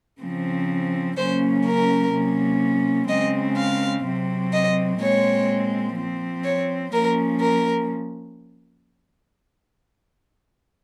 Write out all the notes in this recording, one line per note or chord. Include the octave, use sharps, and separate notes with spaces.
C#3 F3 C4
C#3 F#3 A#3 C#4 C5
A#4
C3 F#3 A#3 C#4
C#3 G#3 C4 D#5
F5
C3 F#3 C4
D#5
A#2 G#3 C4 C#5
F3 C4
C#5
F3 A#3 C#4 A#4
A#4